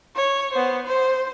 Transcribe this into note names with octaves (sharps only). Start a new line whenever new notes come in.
C#5
B3 C5
C5